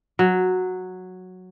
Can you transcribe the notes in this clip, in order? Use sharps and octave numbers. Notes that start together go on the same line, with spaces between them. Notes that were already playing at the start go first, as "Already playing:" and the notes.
F#3